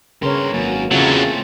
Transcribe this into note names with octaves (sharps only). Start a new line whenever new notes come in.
G2 C#3 A#4 B4 C#5 C6
G#1 F#2 A#3
E2 C#3 F#3 A3 C4 C#4 F4 E5